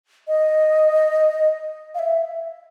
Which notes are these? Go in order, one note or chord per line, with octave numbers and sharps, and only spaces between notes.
D#5
F5
E5